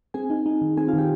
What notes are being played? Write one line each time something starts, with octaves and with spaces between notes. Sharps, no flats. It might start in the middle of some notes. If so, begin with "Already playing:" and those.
C4 G#4 G#5
D#4
D#4
D#3
C4 G#4 G#5
F4 F5
D#3 G4 G5